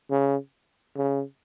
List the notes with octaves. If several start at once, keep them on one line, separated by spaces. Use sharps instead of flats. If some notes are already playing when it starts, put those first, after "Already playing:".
C#3
C#3